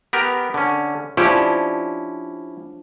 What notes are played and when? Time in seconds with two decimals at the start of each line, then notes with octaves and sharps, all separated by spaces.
0.13 B3 G4 A#4
0.54 D3 C#4
1.17 F3 C#4 D4 E4 G4